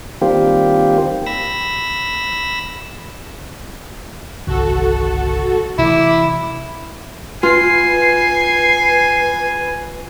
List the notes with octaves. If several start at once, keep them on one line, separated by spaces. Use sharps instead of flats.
D#3 G3 A#3 C4 F4 G4
B5 E6 A#6
G1 C2 D#3 F#4 A4
C3 E3 A3 E4 D6
F4 B4 G#5 C7